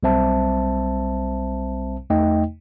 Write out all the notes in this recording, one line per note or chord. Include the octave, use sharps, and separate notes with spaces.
B1 G3 C4 C5 E5 A5
E2 A3 D#4 D#5 G5